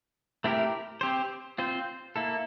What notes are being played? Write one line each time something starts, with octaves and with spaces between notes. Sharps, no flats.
A3 C4 E4 G4 A#4
C4 G4 C5
C4 F4 C5
A#3 E4 A4